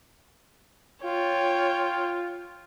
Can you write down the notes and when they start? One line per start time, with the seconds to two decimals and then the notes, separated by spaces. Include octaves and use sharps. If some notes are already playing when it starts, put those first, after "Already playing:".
1.04 F4 C#5 G5